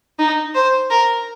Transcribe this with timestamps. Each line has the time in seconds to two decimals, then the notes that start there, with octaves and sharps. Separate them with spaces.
0.19 D#4
0.55 C5
0.90 A#4